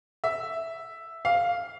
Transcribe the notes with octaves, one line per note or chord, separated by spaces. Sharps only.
E5
F5